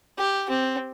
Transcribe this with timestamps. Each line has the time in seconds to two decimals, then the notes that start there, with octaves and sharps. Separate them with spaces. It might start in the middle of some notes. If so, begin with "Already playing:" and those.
0.18 G4
0.50 C4